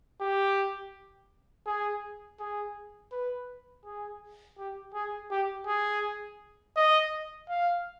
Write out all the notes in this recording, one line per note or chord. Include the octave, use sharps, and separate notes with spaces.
G4
G#4
G#4
B4
G#4
G4
G#4
G4
G#4
D#5
F5